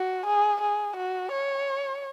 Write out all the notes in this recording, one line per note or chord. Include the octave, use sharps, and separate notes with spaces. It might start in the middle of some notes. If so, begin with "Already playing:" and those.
Already playing: F#4
G#4
G#4
F#4
C#5